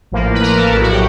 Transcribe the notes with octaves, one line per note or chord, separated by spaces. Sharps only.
A1 A2 F3 A#3
B4
A#4
A4
A#1 A2 F#3 A4
F#4
G4